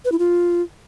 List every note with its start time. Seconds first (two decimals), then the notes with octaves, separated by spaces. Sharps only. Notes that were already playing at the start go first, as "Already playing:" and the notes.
0.05 B4
0.12 E4
0.19 F4